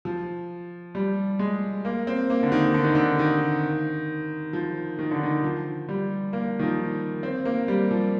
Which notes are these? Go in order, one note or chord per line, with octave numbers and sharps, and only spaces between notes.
F3
G3
G#3
A#3
C4
A#3
D3
D#3
D3
D#3
D3
D#3
F3
D#3
D3
D#3
F3
G3
A#3
D#3
F3
C4
A#3
G3
F3